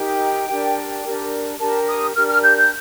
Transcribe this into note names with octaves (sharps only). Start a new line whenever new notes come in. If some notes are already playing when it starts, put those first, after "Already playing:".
Already playing: D#4 G4 A#4 G5
D4 G4 A#4
D4 G4 A#4
D4 G4 A#4 A5
D#6
D4 G4 A#4 F6
F6
G6
G6